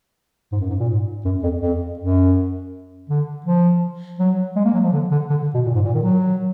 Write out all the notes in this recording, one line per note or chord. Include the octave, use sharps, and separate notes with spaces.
G#2
F#2
G#2
A#2
G#2
F#2
F2
F2
F#2
D3
F3
F#3
G#3
A#3
F#3
F3
D3
D3
D3
D3
B2
A#2
G#2
A#2
D#3
F#3